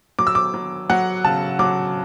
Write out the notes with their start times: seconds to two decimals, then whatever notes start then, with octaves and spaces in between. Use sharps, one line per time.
0.19 F#3 D6
0.27 E6
0.35 D6
0.54 F#3
0.90 F#3 F#5
1.24 C#3 A5
1.59 F#3 D6